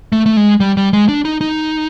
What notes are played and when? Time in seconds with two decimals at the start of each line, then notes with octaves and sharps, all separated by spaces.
0.12 A3
0.26 A3
0.37 G#3
0.60 G3
0.77 G3
0.93 G#3
1.09 D4
1.25 D#4
1.41 D#4